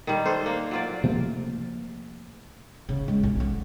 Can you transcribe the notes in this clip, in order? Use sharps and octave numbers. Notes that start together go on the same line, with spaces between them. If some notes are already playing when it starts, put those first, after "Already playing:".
D#3 G3
D4 A4 C5
A#3
F#3 F4 D5
C3 F3 A3 A#3
C#3
G#3
B1
D3